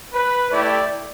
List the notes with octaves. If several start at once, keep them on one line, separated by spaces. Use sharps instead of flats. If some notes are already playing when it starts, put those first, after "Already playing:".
B4
A3 E4 G4 D5